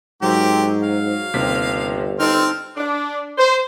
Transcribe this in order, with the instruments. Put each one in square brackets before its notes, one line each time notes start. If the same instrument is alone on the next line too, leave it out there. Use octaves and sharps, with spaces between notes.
[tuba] G#2 [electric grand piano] F#3 [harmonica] C4 G4 A#4
[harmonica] F5
[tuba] G1 [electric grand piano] D#2 C3 B6
[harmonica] C4 F6 [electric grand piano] D#4 A4
[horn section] D4
C5